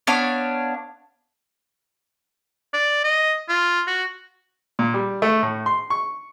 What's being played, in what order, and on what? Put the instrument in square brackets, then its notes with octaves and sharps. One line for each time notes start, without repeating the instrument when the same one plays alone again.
[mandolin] B3 D4 C#5 F5
[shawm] D5
D#5
F4
F#4
[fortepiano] A#2
G3
A3
A2
C6
C#6